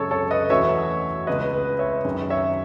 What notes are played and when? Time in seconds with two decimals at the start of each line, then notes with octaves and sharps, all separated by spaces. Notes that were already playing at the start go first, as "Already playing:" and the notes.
Already playing: F#2 C#3 G#3 A4 C#5
0.11 A4 C#5
0.31 B4 D#5
0.49 E2 B2 F#3 A3 C#4 C#5 E5
1.27 C#2 C#3 G#3 B3 B4 D#5
1.53 B4
1.79 C#5 E5
2.04 F#2 D#3 G#3 C#4
2.30 C#5 E5